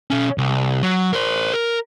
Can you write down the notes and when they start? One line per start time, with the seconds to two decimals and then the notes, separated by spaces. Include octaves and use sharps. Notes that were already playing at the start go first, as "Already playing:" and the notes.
0.11 B2 C#4
0.38 C2
0.83 F#3
1.13 A#4 C5
1.53 A#4